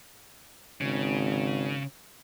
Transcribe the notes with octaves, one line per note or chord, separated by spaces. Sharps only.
G#1 C#3